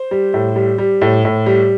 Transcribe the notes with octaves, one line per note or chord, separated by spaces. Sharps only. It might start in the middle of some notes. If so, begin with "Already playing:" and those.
Already playing: C5
G3
A2
G3
G3
A2
A2
G3